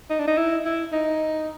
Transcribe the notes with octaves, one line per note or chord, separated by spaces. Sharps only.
D#4
D4
D#4
E4
E4
D#4